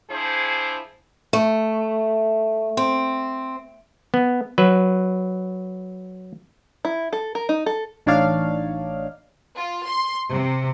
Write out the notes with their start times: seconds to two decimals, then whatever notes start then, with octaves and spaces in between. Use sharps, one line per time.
0.11 F3 D4 E4 G#4 C5
1.33 A3
2.77 C4
4.14 B3
4.58 F#3 B4
6.85 E4
7.13 A4
7.35 A#4
7.49 D#4
7.66 A4
8.06 A1 D4 D#4 C#5 D5 F5
9.56 F4
9.87 C6
10.29 C3